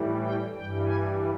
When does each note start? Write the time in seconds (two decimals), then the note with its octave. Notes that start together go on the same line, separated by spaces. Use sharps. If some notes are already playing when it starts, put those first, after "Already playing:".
Already playing: A2 E3 G3
0.23 G5
0.55 G2 E3 G3 G5
0.87 G#5